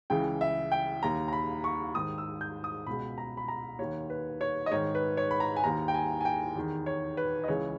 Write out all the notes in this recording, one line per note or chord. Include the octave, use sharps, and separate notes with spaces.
C#2 C#3 E3 G5
E5
G5
D#2 D#3 A#5
A#5
B5
C#6
G#2 D#3 D#6
E6
G6
D#6
C#2 B2 B5
A#5
B5
A#5
D#2 D#3 C#5
B4
C#5
D#5
G#2 D#3 C#5
B4
C#5
B5
A#5
G#5
D#2 D#3 A#5
G5
G#5
G#5
G5
E2 D#3
C#5
B4
D#5
C#2 C#3 E3 C#5